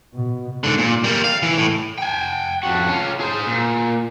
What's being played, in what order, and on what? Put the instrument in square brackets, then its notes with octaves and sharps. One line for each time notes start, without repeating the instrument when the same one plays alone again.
[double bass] B2
[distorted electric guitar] G#2 D3
A#2
G3 A#3
F5
E3
A2
[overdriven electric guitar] G5 G#5
F2 F#4
C#4 F4
G#4 C5
A#2